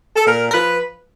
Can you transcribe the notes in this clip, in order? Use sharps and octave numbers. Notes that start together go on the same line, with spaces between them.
A4
A#2 A#4
A#4
F3 B4